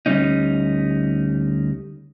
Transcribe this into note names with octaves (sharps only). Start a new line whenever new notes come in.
D2 G3 C#4 D#4